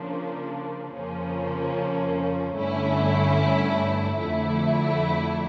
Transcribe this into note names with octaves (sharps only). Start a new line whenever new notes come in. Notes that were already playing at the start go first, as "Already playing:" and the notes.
Already playing: C#3 F3 A#3 D4
F2 C#3 F3 A#3 C#4
G2 D3 A3 C#4 E4
F2 D3 A3 E4